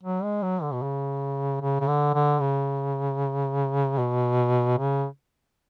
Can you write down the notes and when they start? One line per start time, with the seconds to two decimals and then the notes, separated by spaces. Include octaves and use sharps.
0.03 F#3
0.24 G#3
0.43 F#3
0.62 D3
0.73 B2
0.83 C#3
1.62 C#3
1.80 C#3
1.88 D3
2.14 D3
2.41 C#3
3.98 B2
4.78 C#3